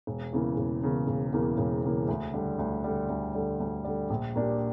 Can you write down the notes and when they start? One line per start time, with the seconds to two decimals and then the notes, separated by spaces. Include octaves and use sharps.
0.07 E1
0.32 E2 C#3 E3 A#3
0.57 E1
0.83 E2 C#3 E3 A#3
1.08 E1
1.33 E2 C#3 E3 A#3
1.58 E1
1.83 E2 C#3 E3 A#3
2.08 D2
2.34 D3 G3
2.59 D2
2.84 D3 G3
3.09 D2
3.35 D3 G3
3.60 D2
3.84 D3 G3
4.10 A#1
4.36 A#2 A#3 D4 G4